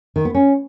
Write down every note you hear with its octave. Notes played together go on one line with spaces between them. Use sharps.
D#3
B3
C#4